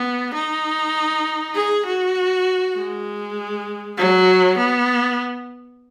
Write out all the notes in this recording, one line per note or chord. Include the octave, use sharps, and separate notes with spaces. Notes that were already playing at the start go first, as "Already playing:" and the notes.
Already playing: B3
D#4
G#4
F#4
G#3
F#3
B3